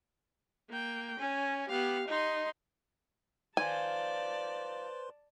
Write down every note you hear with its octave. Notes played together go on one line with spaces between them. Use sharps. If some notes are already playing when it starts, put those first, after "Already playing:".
A#3 G5
C#4 G#5
B3 G4 F5
D#4 D#5 C6
D#3 F3 B4 C5 D5 G#5 A5 C6